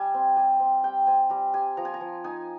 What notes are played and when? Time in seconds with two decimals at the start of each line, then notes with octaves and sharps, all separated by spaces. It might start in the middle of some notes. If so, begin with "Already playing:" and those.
Already playing: G3 G#5
0.14 C4
0.37 G3 G#5
0.60 C4
0.84 G3 G5
1.07 C4 G#5
1.30 G3 A#5
1.54 G3 G#5
1.77 F3 A#5
1.85 G#5
1.94 A#5
2.01 F3
2.24 D#4 G#5